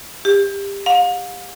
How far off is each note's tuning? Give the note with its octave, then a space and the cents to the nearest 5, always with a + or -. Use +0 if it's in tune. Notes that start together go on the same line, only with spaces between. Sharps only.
G4 +25
F5 +45